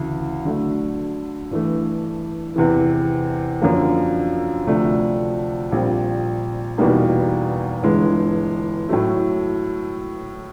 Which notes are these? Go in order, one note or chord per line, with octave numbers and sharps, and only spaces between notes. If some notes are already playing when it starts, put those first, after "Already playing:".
Already playing: D2 C#3 E3
D3 F#3 A3
G2 E3 A3
E2 C3 E3
F#2 D3 F3 A#3
D2 C3 F3 A3 D4
A#1 A#2 G3 C4
E2 B2 G3 A#3 D#4
G1 G2 E3 G#3
A2 F#3 A3